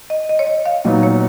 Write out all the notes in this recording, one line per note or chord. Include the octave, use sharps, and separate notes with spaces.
D#5
D#5
C#5
D#5
F5
A#2 F#3 B3 D#4 D#5
C#5